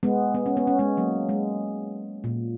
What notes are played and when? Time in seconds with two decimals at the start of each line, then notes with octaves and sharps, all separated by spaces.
0.03 G#3 B3
0.35 B3
0.46 C#4
0.57 B3
0.67 C#4
0.79 G#3 B3
0.97 F#3 A#3
1.29 G#3
2.24 A#2